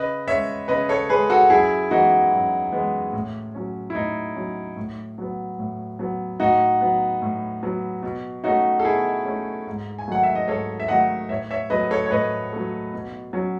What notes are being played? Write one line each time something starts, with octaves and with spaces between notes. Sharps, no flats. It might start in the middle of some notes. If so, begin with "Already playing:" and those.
Already playing: C#3 B4 D#5
G#3 C#4 C#5 E5
C#3 B4 D#5
A4 C#5
G#3 C#4 G#4 B4
F#4 A4
F#2 E4 G#4
E3 G#3 B3 D#4 F#4
F#2
E3 G#3 B3
A2
F#3 C#4
E4
A2 D#4
F#3 C#4
A2
F#3 B3
A2
F#3 B3
A2 D#4 F#4
F#3 B3
A2
F#3 B3
B2
A3 C#4 D#4 F#4
A4
B2 E4 G#4
A3 C#4
G#2
G#5
D#3 F#3 A3 F#5
E5
D#5
G#2 A4 C#5
E5
D#3 F#3 A3 D#5 F#5
A2 C#5 E5
C#5 E5
F#3 A3 B4 D#5
A4 C#5
C#5
A2 B4 D#5
F#3 A3
B2
F#3 C#4